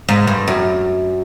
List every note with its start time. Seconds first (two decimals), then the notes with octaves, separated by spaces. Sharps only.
0.09 G#2
0.27 G2
0.48 F#2